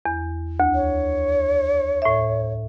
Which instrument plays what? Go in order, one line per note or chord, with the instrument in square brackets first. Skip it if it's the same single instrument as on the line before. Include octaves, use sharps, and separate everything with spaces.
[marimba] E2
D2
[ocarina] C#5
[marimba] A2 E5